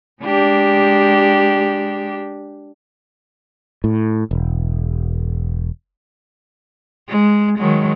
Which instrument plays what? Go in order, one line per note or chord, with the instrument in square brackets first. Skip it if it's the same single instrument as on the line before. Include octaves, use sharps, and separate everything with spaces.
[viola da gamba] G#3 D4 G4
[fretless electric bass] A2
E1
[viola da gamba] G#3
D#3 F#3 G#3